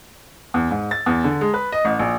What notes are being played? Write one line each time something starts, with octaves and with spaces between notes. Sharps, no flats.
E2
G#2
A6
E2
D3
G#3
B4
D#5
A1
A#1